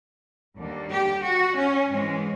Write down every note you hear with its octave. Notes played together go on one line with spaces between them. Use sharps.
D#2 D3 G3 A#3
G4
F#4
C#4
G#2 E3 G#3 C#4